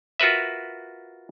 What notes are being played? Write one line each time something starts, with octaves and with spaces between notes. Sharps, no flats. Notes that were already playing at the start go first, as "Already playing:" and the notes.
F4 F#4 A#4 B4 E5